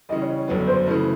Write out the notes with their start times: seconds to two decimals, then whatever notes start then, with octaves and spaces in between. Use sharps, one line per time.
0.09 C#3 E3 G3 D#5
0.22 C#5
0.48 G1 F#2 D3 F#3 B3 B4
0.67 C5
0.86 C#3 E3 A3 B4